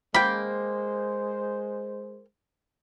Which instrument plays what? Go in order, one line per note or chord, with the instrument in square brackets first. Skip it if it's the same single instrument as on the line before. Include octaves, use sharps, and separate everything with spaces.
[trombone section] G#3 C5 [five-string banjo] A#3 G5 [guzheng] B5